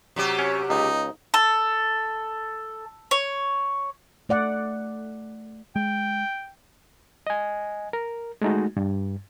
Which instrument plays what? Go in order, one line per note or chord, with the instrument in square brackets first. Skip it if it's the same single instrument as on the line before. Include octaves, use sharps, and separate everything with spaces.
[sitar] C3 F#3 G4
[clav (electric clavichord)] C#4 C#5
[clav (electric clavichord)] C#2 [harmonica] D#4
[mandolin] A4
C#5
[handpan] A3 D5 F#5
[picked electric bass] G#3 [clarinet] G5
[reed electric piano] D#5 G#5
A#4
G#3 A3 D#4 F#4
G2